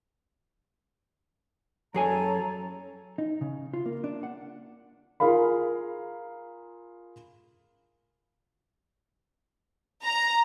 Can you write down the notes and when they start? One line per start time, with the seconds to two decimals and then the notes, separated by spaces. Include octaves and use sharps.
1.94 F#2 G#4 A4 C#5 G#5 A#5
3.18 D#4
3.41 C#3
3.74 F4
3.86 A#3
4.04 D4
4.23 F#5
5.20 F4 G#4 A#4 F5 B5
10.04 A#5